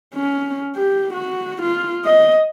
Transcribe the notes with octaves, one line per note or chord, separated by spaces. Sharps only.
C#4
G4
F#4
F4
D#5